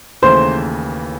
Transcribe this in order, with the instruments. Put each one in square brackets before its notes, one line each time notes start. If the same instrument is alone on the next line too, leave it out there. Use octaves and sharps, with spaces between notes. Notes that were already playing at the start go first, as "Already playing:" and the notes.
[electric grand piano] D#2 C#3 E3 A3 [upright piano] C5